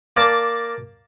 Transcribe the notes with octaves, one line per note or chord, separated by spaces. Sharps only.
A#3 D5 A5 D6